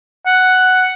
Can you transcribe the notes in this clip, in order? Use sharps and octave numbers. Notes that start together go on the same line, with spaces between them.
F#5